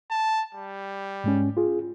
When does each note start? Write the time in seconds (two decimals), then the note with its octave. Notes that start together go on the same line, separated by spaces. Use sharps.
0.11 A5
0.55 G3
1.24 G#2 G#3 C#4
1.57 F4 G#4